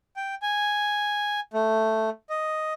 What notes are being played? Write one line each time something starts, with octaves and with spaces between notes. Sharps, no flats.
G5
G#5
A3
D#5